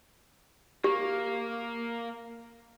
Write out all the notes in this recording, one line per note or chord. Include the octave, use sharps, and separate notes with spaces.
A#3 G4